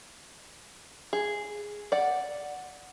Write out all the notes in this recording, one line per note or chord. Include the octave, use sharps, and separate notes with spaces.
G#4
D5 F#5